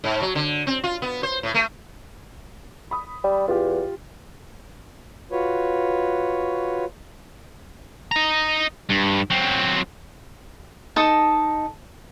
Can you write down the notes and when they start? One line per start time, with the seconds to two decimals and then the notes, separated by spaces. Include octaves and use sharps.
0.04 G#2
0.22 F#3
0.35 D3
0.67 C4
0.84 F4
1.02 B3
1.23 C5
1.43 A2
1.54 A3
2.91 B5 D#6
3.24 G3
3.48 E2 F4 G4
5.32 F4 F#4 B4 C#5
8.12 D#5 A#5
8.89 G2
9.31 F#3 C4
10.96 D#4 A4 A5 D#6